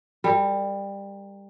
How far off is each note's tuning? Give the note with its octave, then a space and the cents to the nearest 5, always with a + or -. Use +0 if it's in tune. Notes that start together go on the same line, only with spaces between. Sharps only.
G3 +20 A#4 -40